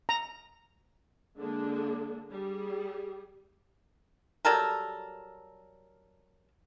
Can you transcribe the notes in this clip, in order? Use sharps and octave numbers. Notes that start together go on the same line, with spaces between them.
A#5
D3 G#3 A#3 D4 G#4
G3 G#4
F#3 G3 A4 A#4